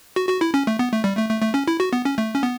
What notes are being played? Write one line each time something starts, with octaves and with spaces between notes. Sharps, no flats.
F#4
F#4
E4
C#4
A3
B3
A3
G3
A3
A3
A3
C#4
E4
F#4
B3
C#4
A3
C#4
B3